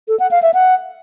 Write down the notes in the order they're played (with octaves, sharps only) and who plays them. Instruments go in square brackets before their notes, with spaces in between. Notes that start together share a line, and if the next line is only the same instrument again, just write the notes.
[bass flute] A4
F#5
F5
E5
F#5